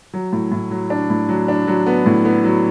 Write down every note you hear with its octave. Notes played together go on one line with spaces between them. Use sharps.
F#3
A2
A2
F#3
D4
A2
F#3
D4
F#3
B3
A2
B3
F#3